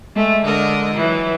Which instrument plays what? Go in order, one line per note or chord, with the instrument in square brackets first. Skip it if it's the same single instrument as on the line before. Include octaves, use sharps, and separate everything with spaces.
[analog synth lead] G#3 [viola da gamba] A3
[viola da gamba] D3 A#4 D#5
E3 F#3